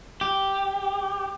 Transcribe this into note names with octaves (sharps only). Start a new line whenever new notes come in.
G4